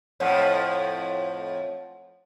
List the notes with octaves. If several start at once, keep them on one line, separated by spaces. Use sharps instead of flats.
F2 A2 F3 C#5 F#5